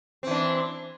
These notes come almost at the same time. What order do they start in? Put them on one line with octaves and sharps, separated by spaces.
C4 E3 D4